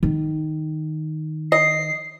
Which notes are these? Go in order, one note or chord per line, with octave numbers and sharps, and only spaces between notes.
D#3
D#5 C7